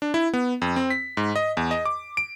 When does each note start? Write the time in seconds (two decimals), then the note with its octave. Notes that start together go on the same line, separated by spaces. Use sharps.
0.02 D4
0.14 E4
0.33 B3
0.62 F2
0.76 C4
0.90 B6
1.17 G#2
1.36 D#5
1.57 E2
1.71 D#5
1.86 D6
2.17 D7